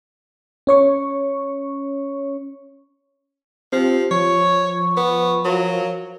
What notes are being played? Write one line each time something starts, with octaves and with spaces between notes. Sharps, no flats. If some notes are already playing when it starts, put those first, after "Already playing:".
C#4 C#5 C#6
F3 C4 F4 G4
F3 C#5 C#6
B3
F#3 A#4 F5